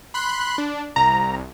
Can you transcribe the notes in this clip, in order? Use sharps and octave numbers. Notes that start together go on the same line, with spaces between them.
B5 C6 F#6
D4
C2 A#5